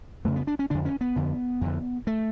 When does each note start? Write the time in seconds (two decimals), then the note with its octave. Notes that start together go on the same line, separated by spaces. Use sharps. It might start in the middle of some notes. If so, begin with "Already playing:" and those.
0.25 F2 C#3 A3
0.36 B3
0.47 D4
0.59 C#4
0.70 F2 D3 D4
0.85 C#4
1.01 B3
1.16 F2 D3
1.61 F2 D3
2.07 A3